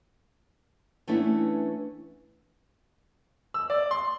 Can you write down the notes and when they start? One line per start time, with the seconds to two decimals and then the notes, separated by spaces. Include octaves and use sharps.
1.08 E3 A3 B3 C#4 D4 E4
3.54 E6
3.70 D5
3.91 C6